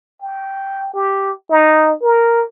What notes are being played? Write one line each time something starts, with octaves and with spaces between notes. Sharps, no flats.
G5
G4
D#4
A#4